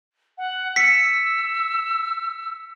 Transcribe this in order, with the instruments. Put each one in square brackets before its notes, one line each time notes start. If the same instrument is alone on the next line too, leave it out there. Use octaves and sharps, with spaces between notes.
[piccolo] F#5
[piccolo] E6 [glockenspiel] B6 C#7